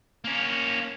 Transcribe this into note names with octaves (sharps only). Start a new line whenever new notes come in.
A#3 C#4